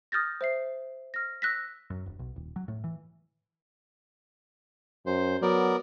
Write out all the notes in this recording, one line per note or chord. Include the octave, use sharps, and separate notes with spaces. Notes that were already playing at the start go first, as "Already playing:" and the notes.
D#6 F6 G6 A6 A#6
C5 E5 C7
F6 A#6
E6 F#6 A#6 B6
F#2
E1
B1
D#1
F#3
A2
E3
F#2 C5
F#3 B3 A#4 D5